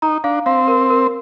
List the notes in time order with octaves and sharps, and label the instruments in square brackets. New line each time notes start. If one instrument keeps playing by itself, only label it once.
[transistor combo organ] D#4 [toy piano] A#5
[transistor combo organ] D4 [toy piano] F5
[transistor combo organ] C4 [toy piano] F5
[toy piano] A#4
A#4